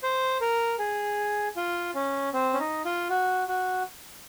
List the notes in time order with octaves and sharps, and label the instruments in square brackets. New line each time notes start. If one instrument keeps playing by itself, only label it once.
[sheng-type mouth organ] C5
A#4
G#4
F4
C#4
C4
C#4
D#4
F4
F#4
F#4